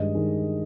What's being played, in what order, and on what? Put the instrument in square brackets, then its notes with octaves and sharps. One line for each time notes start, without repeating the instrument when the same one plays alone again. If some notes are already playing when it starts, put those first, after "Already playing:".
Already playing: [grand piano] G2 D#3 G#3 D#5
D#3 G#3